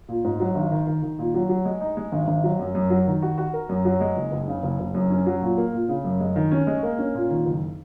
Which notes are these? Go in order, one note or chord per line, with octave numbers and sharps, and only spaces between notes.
A#2
G#2
F#3
G#1
D#3
D#3
D#3
A#2
F#3
F#3
G#3
D#4
G#3
G#1
G#1
F#3
F#2
F#2
F#3
D#3
F#4
F#4
A#4
F#2
F#3
G#3
F#1
F#1
C#3
F#1
F#1
F#2
C#4
F#3
A#2
A#3
A#2
C#3
F#2
G#3
D#3
C#4
G#3
A#3
C#4
A#2
D#3
F#1